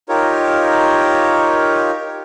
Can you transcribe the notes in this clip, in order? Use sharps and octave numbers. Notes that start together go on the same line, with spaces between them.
D#4 F4 G4 A#4 C#5